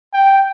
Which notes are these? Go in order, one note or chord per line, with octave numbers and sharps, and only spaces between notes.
G5